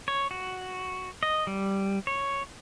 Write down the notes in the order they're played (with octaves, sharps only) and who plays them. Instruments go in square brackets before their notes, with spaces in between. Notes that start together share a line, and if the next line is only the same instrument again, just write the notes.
[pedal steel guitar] C#5
F#4
D#5
G3
C#5